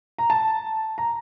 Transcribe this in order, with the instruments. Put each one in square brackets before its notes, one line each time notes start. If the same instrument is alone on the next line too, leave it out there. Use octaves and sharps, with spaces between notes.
[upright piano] A#5
A5
A#5